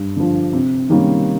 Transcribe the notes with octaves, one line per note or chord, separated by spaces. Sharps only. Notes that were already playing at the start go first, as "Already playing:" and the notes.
Already playing: G2
D3 F3
C3
D#3 G3 A#3 C#4